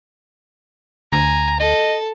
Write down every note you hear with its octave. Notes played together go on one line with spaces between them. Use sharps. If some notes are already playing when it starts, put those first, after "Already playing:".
D2 G#5 A#5
A4 D#5